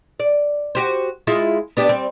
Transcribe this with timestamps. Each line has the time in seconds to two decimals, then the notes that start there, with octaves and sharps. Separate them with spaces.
0.20 D5
0.75 F#4 G4 C5
1.27 G#3 E4 F4
1.77 B3 D4 G4
1.89 G3 C4